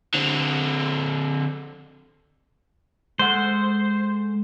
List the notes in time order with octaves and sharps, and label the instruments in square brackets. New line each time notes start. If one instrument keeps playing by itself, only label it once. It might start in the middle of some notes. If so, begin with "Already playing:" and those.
[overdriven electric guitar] D3 C4
[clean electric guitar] G#3 A4 F#5 [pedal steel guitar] C5